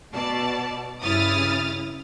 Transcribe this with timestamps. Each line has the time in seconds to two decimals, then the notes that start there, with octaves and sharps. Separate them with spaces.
0.12 B2 D5 A5
1.03 G2 C#3 E4 D#6 F6 A6